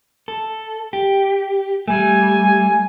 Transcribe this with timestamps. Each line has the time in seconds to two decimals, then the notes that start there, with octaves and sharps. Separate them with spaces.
0.28 A4
0.93 G4
1.88 G3 A3 G#5